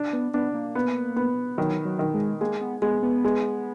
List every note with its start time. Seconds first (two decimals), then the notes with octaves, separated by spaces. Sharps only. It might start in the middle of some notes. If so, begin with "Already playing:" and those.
Already playing: D4
0.13 B3
0.34 B3 D4
0.54 A#3
0.75 B3
1.16 B3
1.58 D#3 F#3
1.85 F#3
1.99 D#3
2.14 G#3
2.41 G#3 A#3
2.61 B3
2.82 G#3 B3
3.03 B3
3.24 G#3